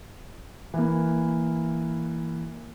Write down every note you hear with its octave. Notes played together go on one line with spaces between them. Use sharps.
E3 A#3